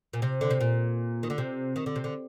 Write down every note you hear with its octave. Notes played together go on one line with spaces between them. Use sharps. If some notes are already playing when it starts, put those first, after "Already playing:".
A#2
C3
D3
C3
A#2
D#3
D3
C3
D#3
D3
C3
D3